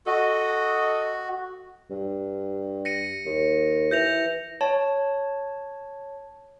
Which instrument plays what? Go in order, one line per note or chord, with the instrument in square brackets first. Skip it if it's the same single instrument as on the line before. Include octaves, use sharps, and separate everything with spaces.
[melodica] F#4 [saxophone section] A4 D#5
[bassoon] G2
[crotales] A#6 C#7 D#7
[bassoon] D#2
[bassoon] E3 [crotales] G6 A#6 F7
[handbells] C#5 A5